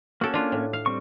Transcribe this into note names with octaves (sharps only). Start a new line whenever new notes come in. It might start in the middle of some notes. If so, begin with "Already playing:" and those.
A#3 C#4 F#4 A4
D4 F4
A2
F5
G3 C4 C#6